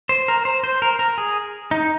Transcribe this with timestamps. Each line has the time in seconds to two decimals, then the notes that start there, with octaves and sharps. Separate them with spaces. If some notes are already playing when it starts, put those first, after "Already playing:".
0.09 C5
0.28 A#4
0.45 C5
0.64 C5
0.82 A#4
0.99 A#4
1.18 G#4
1.71 D#4